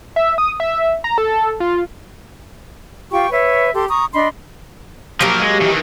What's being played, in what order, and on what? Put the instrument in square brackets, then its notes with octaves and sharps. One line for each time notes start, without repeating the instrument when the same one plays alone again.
[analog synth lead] E5
D#6
E5
A#5
A4
F4
[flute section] F4 G4 G5 C#6
B4 C#5 E5
G4 A4 C6
A#5 C#6 D#6
D4 D#5 B5 C6
[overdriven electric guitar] F3 A#4 [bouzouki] F#3 A#3 G4
[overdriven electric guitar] G#3
D#3 E3